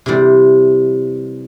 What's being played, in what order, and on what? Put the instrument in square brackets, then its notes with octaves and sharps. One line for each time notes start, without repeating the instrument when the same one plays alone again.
[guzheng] C3 E3 G3